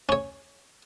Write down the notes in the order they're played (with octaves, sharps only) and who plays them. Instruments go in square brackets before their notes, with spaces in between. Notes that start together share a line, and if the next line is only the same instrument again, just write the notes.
[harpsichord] C#4 C#5